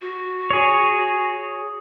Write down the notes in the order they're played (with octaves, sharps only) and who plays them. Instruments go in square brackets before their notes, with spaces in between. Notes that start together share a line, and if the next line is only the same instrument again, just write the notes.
[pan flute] F#4
[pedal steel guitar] G#4 C#5